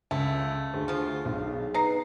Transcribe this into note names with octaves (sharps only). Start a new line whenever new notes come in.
C#2 A3
D2 G#4
F3 F4
B1
D#4 B4 A#5 C7